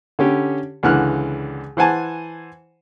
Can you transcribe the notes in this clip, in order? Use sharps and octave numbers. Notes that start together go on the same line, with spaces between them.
D3 C#4 G4
C#2 D3 E3 F#5 F6 F#6
E3 C5 F#5 G#5 A5